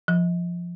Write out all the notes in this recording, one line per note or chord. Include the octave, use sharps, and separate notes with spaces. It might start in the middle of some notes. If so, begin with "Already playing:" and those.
F3